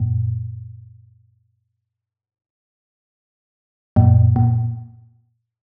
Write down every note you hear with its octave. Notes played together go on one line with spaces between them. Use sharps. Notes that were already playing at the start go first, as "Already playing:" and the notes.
Already playing: F#2 A#2
F#2 A#2
A#2